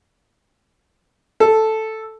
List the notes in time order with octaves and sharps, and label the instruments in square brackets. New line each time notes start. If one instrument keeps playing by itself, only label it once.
[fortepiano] A4